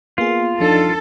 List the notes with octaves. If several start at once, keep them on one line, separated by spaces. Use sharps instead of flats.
A#3 B3 F4 G#4
F3 D4 D#4 A4